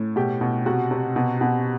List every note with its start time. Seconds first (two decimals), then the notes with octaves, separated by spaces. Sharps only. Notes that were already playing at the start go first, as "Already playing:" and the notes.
Already playing: A2
0.16 B2 G4
0.41 B2
0.66 C3 F#4
0.91 C3
1.16 B2
1.41 B2